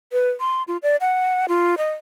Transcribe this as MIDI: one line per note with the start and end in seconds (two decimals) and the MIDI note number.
0.12 0.30 71
0.40 0.63 84
0.68 0.77 65
0.83 0.96 74
1.01 1.46 78
1.48 1.75 65
1.78 1.91 75